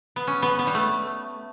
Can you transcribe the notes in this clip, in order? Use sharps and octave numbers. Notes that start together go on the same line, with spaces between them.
B3
C#4
B3
B3
G3
A3